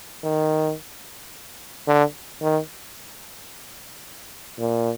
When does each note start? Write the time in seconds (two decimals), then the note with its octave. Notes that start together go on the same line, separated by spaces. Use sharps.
0.24 D#3
1.87 D3
2.42 D#3
4.59 A#2